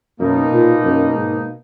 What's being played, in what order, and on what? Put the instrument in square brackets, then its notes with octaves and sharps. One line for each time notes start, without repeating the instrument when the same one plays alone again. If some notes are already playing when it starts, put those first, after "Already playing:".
[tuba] F#2 [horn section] B2 A#3 D#4
[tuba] A#2
F#2
G#2